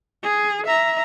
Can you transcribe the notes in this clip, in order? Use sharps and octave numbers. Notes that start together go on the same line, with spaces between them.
G#4
E5 A#5